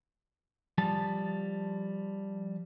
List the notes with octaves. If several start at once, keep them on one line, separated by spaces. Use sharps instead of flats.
F3 G3 A5